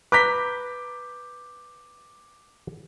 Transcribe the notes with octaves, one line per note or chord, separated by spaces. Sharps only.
B4 A#5 D6 G6 B6